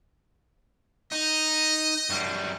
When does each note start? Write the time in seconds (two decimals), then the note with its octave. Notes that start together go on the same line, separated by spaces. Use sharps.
1.12 D#4 D#5
2.10 F#2 G3